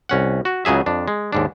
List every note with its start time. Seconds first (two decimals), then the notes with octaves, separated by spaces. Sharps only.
0.09 C2 C#4 F#5
0.45 F#4
0.65 C#2 C#3 F#3 G#4 E5
0.86 F2 D4
1.08 G#3
1.33 D#2 G#2 D4